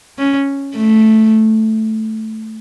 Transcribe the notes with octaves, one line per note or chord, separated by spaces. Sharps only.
C#4
A3